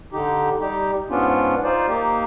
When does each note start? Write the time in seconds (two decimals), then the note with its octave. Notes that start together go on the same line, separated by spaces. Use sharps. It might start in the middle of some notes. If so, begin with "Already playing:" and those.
0.13 D3 D#4 G4
0.60 G3 D#4 G4
1.10 G#2 B3 C#4 D4 F4
1.64 D#4 F4 C5 D5
1.88 A#3 D#4 G4